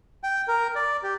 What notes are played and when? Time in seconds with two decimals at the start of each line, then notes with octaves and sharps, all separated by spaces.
0.24 G5
0.48 A#4
0.75 D5
1.03 G4